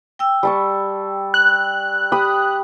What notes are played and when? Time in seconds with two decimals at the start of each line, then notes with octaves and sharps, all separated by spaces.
0.19 G5 E6
0.43 G3 A5 C#6
1.34 F#6
2.12 G4 B5 D#6